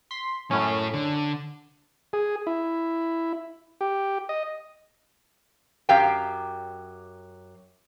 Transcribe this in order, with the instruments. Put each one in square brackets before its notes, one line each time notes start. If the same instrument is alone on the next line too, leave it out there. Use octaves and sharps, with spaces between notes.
[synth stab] C6 B6
[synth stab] F#2 C#4 [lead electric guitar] A2 A3
[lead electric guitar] D3
[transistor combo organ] G#4
E4
G4
D#5
[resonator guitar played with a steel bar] F#2 F#3 G4 F5 G5